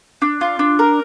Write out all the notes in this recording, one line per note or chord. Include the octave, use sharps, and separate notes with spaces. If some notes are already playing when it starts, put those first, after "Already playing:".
D4
F4
D4
A#4